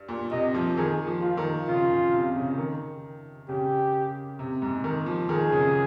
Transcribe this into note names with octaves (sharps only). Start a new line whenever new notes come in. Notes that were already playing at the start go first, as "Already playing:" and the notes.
Already playing: G2
A#2
C3 D#5
F3
D#3 G#4
F3
F4
D#3
C#3 F4
C#3
C3
C#3
D#3
C#3 G4
C3
G#2
D#3
F3
D#3 G#4
C#3